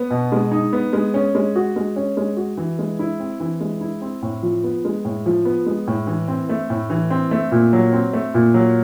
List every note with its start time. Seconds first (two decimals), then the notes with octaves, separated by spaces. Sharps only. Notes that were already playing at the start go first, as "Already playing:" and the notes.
Already playing: B3
0.10 B2
0.32 G#3
0.51 D#4
0.73 B3
0.93 G#3
1.14 C#4
1.35 G#3
1.56 F#4
1.76 G#3
1.96 C#4
2.17 G#3
2.37 F#4
2.57 E3
2.79 G#3
2.99 E4
3.20 C4
3.40 E3
3.61 G#3
3.81 E4
4.01 C4
4.22 A2
4.43 F3
4.64 B3
4.85 G#3
5.05 A2
5.26 F3
5.45 B3
5.66 G#3
5.87 A2
6.07 E3
6.28 C4
6.49 A3
6.70 A2
6.90 E3
7.10 C4
7.31 A3
7.52 A#2
7.73 F#3
7.93 C4
8.13 A3
8.34 A#2
8.54 F#3